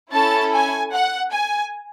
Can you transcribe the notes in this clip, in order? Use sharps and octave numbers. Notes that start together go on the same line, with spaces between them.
C#4 E4 A4 A5
G#5
F#5
G#5